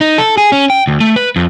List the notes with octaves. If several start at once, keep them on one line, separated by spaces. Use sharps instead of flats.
D#4
A4
G#4
C#4
G5
D2
A3
B4
F2